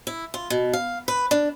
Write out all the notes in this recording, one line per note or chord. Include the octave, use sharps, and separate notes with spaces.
E4
F4
B2
F5
B4
D4